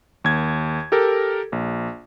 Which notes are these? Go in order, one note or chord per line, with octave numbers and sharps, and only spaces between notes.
D#2 G#6
G4 A4 A#4
A#1